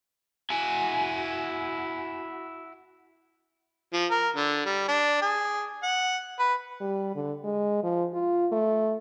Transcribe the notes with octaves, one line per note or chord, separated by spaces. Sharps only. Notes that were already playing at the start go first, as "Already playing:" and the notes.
E4 F#4 G#5
F3
A#4
D3
G3
D4
G#4
F#5
B4
G3
D3
G#3
F3
F4
A3